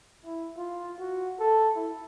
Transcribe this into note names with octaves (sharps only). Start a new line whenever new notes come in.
E4
F4
F#4
A4
E4